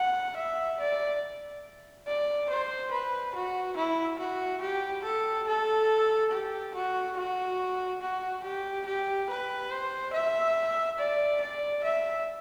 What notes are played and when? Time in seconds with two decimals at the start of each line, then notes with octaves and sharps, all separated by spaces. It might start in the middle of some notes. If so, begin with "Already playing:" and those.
Already playing: F#5
0.36 E5
0.80 D5
2.07 D5
2.49 C5
2.91 B4
3.35 F#4
3.77 E4
4.19 F#4
4.61 G4
5.04 A4
5.47 A4
6.31 G4
6.74 F#4
7.17 F#4
8.01 F#4
8.44 G4
8.86 G4
9.29 B4
9.71 C5
10.13 E5
10.98 D5
11.40 D5
11.84 E5